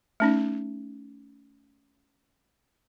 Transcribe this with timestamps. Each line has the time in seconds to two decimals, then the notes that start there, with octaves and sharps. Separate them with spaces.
0.20 A3 C#4 D#4